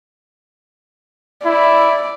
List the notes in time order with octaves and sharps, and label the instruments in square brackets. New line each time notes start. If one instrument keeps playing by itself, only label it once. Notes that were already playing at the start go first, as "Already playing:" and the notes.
[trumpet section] E4 [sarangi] D5